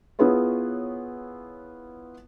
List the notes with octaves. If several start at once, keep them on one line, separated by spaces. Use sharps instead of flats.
B3 E4 F4 G#4 B4 C#5